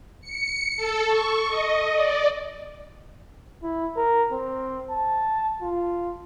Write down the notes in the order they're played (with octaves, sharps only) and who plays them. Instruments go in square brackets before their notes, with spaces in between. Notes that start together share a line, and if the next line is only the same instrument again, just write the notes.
[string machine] C#7
A4
C#6
D#5
D5
[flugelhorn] E4
A#4
C4
A5
F4